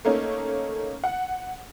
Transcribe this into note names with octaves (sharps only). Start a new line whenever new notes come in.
A3 A#3 C#4 D#4
F#5